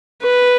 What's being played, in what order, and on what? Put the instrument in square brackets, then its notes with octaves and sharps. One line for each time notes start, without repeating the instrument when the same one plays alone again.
[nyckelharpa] B4